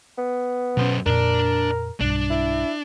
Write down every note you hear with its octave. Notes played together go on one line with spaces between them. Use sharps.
B3
F#2 B2 C#4 C5
F2 A#2 D4 A#4 D5
B1 G2 D4
E4